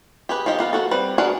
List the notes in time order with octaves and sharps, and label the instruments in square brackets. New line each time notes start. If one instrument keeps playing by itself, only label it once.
[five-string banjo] G4 G#4 B4
F3 D#4 G4 D#5
B3 F4 A#4
A#3 F#4 A4
G3 C4 B4
D4 F#4 G#4 A#4 B4